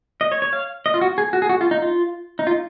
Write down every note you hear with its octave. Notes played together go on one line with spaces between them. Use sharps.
D#5
C#5
C#5
F5
D#5
F4
F#4
G#4
F#4
G#4
F#4
F4
D#4
F4
D#4
F4